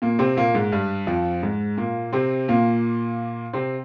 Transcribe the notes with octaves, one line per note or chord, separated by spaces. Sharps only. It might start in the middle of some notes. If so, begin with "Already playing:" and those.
A#2 A#3
C3 C4
A#2 A#3
G#2 G#3
G2 G3
F2 F3
G#2 G#3
A#2 A#3
C3 C4
A#2 A#3
C3 C4